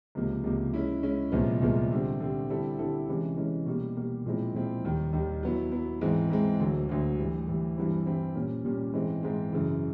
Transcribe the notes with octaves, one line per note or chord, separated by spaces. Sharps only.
C#2 C3 F3 A#3
C#2 C3 F3 A#3
G#3 C#4 E4
G#3 C#4 E4
C2 A#2 F3 G#3 B3
C2 A#2 F3 G#3 B3
D3 G3 C4
D3 G3 C4
D3 G3 C4 E4 A4
D3 G3 C4 E4 A4
C3 E3 G#3 C#4
C3 E3 G#3 C#4
B2 G3 A#3
B2 G3 A#3
A#2 F3 G#3 C4 E4
A#2 F3 G#3 C4 E4
D#2 D#3 G3
D#2 D#3 G3
F#3 B3 E4
F#3 B3 E4
G#2 E3 G#3 C4
G#2 E3 G#3 C4
D2 D3 F#3
D2 D3 F#3
A2 E3 G3
A2 E3 G3
G2 E3 G3 C4 E4
G2 E3 G3 C4 E4
A#2 G3 A#3 C#4
A#2 G3 A#3 C#4
G#2 E3 G#3 C4
G#2 E3 G#3 C4
F#2 C#3 E3